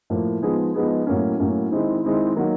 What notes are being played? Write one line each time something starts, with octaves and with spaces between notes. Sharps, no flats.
A2 F3 A#3
F3 G#3 B3 D#4 G#4
F3 G#3 B3 D#4 G#4
A2 F#3 A#3 C#4
A2 F#3 A#3 C#4
D#3 G#3 C4 E4
D#3 G#3 C4 E4
D#3 F#3 A#3